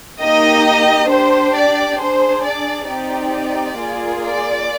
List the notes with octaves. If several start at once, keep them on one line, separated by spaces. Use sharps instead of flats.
A#3 D#4 G4 D#5
D4 G4 C5
D5
D4 G#4 C5
D5
C4 D#4 G4 D5
A#3 F4 G#4
D5